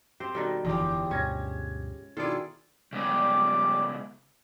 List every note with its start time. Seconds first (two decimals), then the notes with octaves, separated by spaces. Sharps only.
0.20 C4 G4 C5
0.35 B2 D#3 G3 A4
0.65 F#1 E2 D3 E3 F3 G#3 G4
1.11 D2 G2 B2 C#4 G#6 A#6
2.17 B2 D#3 D4 E4 F4 G#4 A4 D5
2.93 C#3 G3 G#3 B3 D6